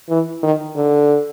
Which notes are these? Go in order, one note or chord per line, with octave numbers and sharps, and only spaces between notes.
E3
D#3
D3